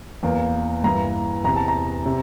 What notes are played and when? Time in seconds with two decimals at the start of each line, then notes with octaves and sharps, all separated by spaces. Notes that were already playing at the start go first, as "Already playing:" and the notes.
0.23 E2 E3 A#3
0.84 G2 E3 A#3 E4 A#5
1.44 E2 C3 E3 A#5
1.56 A5
1.68 A#5
2.06 C3